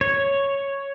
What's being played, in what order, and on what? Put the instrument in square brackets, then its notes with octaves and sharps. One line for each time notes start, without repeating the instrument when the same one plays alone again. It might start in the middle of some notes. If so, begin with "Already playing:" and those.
[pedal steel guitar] C#5